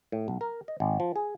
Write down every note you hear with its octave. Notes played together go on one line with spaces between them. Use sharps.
A2
B1
A#4
D#5
G#1
F3
G#4